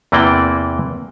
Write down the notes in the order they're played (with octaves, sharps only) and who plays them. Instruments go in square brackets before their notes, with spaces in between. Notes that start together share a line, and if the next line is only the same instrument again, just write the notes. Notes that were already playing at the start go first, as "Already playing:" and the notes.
[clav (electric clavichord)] E2 C3 E3 A#3 D5 G5